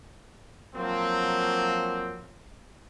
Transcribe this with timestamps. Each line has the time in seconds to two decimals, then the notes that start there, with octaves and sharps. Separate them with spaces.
0.74 F3 F#3 A#3 C4